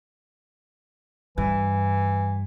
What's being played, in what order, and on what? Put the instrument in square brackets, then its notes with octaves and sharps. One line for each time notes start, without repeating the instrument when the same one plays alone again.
[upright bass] G2 [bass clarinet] E3